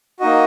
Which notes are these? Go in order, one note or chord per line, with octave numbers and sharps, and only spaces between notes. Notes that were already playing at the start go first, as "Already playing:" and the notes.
A#3 D#4 F#4 D#5